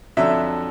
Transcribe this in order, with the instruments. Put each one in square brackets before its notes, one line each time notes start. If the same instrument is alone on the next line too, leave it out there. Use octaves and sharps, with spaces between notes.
[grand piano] F2 D3 F#3 E5